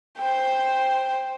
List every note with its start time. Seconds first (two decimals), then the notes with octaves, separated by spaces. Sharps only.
0.18 C5 G5